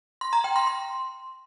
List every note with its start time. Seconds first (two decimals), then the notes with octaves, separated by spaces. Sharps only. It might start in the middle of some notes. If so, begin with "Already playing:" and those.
0.21 C6
0.33 A#5
0.44 G5
0.56 C6
0.67 C6